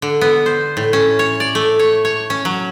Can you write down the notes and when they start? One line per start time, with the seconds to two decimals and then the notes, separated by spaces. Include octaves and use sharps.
0.02 D3
0.21 B3
0.46 C5
0.77 A2
0.93 C#4
1.19 C#5
1.40 D5
1.55 A3
1.79 C#5
2.05 C#5
2.30 C#4
2.45 F#3